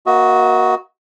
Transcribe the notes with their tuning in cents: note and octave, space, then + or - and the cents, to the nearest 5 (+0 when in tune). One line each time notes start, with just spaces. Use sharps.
A#3 +25 F#4 +0 D#5 +40